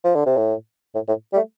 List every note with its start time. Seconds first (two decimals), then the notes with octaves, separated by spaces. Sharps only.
0.04 F3
0.15 D3
0.26 C3
0.37 A2
0.95 A2
1.08 A2
1.33 G3
1.36 A3